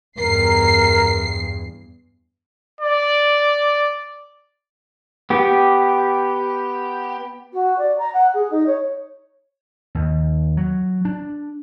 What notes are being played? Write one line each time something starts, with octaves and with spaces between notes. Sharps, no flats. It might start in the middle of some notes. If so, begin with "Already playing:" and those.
E2 G2 A#4 C7
D5
B3 G4
F#4
D5
A#5
F#5
G#4
D#4
C#5
D#2
F#3
D4